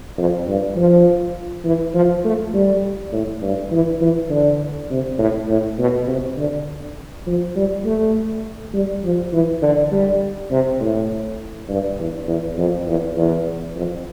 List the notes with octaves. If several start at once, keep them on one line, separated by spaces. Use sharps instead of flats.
F2
G2
F3
E3
F3
A3
G3
A2
G2
E3
E3
D3
C3
A2
A2
B2
C3
D3
F3
G3
A3
G3
F3
E3
D3
G3
C3
A2
G2
E2
E2
F2
E2
E2
F2